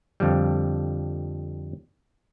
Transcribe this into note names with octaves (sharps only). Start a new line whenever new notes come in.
F2 D3 F3 G3